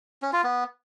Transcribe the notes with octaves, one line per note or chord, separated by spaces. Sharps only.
C#4
F4
B3